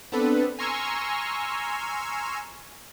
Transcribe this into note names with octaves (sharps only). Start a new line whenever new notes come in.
B3 C4 D4 A4 B4
G#5 A#5 C6 C#6 E6 F6